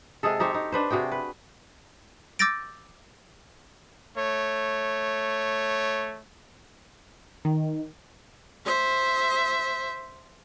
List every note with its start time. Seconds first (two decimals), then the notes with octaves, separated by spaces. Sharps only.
0.23 C3 G#3 G#4 A4
0.40 D#4 G4 C5 C#5
0.54 D#4
0.72 D4 B4 C5
0.90 C3 F#4 G#4 G5
1.12 B4
2.39 D6 E6 G6 A6 A#6 D7
4.17 A3 C#5
7.45 D#3
8.65 C5 E5